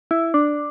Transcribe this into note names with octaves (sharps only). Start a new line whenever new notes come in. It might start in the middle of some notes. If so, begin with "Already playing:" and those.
E4
D4